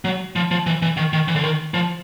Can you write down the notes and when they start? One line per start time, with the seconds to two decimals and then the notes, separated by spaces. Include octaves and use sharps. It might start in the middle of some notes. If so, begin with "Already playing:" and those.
0.05 F#3
0.36 F3
0.51 F3
0.66 E3
0.82 E3
0.97 D#3
1.13 D#3
1.28 E3
1.36 D3
1.44 D#3
1.74 F3